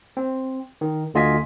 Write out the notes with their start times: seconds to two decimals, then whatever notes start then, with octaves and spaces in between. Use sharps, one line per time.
0.17 C4
0.81 D#3
1.14 D2 D3 F4 D#5 G#5 B6